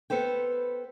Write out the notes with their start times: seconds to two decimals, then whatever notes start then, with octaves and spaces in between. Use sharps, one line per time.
0.10 B3 A4 B4 C5 G5